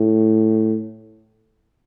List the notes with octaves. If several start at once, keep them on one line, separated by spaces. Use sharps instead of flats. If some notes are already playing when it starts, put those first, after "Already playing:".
Already playing: A2